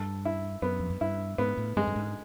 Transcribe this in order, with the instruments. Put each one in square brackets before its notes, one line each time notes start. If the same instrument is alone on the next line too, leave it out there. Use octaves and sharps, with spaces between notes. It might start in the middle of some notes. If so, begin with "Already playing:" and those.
Already playing: [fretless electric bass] G2 [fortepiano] A4
[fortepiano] E4
[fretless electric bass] F#2 [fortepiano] B3
[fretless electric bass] F2
F#2
[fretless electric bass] G2 [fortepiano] E4
[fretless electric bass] G#2 [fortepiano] B3
[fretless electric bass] A2
[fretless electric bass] G2 [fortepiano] G#3
[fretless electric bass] G2
G#2